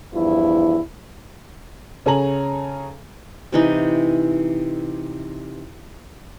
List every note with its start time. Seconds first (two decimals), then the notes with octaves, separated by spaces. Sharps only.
0.14 E2 G2 F3 E4
2.06 C#3 C#4 A4 G#5 A#5 F#7
3.52 C3 E3 D#4